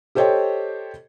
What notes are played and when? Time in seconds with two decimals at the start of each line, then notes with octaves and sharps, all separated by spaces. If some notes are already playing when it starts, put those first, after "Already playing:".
0.15 G4 A4 C5 C#5 D#5 G5